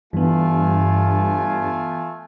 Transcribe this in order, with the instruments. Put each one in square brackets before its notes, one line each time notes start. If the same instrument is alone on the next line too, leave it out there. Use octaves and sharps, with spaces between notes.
[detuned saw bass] G2 [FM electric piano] E3 B3 [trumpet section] A3 F4 G#5